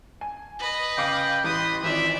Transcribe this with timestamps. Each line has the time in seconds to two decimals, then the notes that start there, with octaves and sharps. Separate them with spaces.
0.21 G#5
0.59 B4 D#5
0.97 C#3 F5 G5 D6
1.44 A1 B4 C6 D#6
1.83 G#1 E3 F4 D5 E5